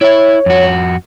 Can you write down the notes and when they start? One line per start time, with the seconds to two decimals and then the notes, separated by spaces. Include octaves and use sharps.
0.01 E4 C#5 E5
0.46 F2 F#4